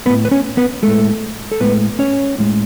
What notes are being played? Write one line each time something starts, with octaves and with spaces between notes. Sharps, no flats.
G#3 B3 B4
A2
B4
C#4 C#5
B3 B4
A2 G#3 A3 A4
A4
A2 G#3 B3 B4
C#4 C#5
A2 G#3